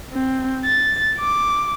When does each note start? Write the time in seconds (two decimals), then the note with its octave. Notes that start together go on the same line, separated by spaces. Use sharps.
0.13 C4
0.66 A6
1.20 D6